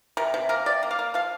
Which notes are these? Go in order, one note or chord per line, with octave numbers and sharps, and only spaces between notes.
C3 A#4
C3
A#3 A#4
C3 D5
A#3
F5
A#3
F3 F5